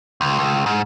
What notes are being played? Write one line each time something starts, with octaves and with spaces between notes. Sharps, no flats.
C#2
C#2
G#2